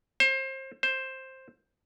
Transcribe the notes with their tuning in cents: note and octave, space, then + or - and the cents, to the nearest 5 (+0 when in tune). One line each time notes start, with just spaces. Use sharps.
C5 +30
C5 +10